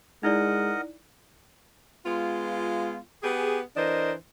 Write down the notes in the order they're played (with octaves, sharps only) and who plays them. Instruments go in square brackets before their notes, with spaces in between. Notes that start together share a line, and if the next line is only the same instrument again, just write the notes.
[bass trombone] G#3 [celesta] D#4 E4 D5 [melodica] A#4 D#5 F#5
[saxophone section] G#3 B3 F4
B3 G4 G#4
E3 D4 A#4 C5 D#5